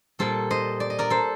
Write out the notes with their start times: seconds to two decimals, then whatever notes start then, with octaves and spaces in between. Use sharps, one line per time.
0.19 A#2 G3 A4 C5
0.51 C5 D#5
0.80 D5
0.90 D#5
0.99 A#4 D5
1.10 A4 C5